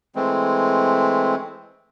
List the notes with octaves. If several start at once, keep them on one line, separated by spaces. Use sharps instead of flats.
E3 G#3 A3 C4